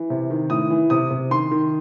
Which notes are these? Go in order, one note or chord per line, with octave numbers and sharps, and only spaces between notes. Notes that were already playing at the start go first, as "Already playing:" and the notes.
Already playing: E3
C3
D#3
A2 D#6
E3
C3 D#6
C3
D#3 C6
D#3